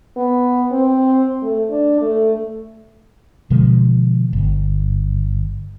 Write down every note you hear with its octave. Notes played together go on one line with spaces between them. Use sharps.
B3
C4
A3
D4
A3
B2 D3 F3 G#3
G1